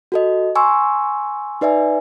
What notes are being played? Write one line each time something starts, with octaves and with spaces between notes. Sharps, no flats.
F#4 A4 D#5
G#5 C6 C#6 E6
D#4 B4 D5 E5 G#5